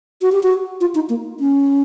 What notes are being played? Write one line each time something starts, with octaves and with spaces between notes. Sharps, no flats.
F#4
G4
F#4
F4
D#4
A#3
C#4